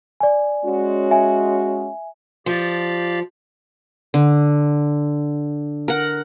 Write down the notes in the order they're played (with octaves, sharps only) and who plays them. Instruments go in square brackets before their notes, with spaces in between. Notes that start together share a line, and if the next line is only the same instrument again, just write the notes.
[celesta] D5 G#5
[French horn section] G#3 C#4 F#4
[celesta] E5 G#5
[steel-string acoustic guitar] F3 [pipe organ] G4 D5 F5
[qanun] D3
A#4 F#5